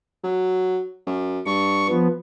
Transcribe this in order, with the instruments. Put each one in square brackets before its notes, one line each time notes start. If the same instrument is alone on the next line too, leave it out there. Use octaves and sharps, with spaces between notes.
[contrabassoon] F#3
F#2
[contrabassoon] G2 [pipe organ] C#6
[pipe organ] F3 B3